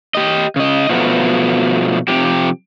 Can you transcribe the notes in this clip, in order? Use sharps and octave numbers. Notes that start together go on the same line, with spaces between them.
G4 D#5
C#3 D#5
B2 F3 F#3 A3 B3
C3 F3 G4